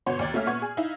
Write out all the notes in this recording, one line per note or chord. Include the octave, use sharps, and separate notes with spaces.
G1 B2 B3 C#5 C6
D#2 D5 G#6
A3 A#3 C#4 E5 F6
A#2 B3 C#6 G#6
G#4
D#4 E4 F5